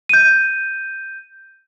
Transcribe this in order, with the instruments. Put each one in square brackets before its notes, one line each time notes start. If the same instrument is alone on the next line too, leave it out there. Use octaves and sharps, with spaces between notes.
[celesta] G6 D#7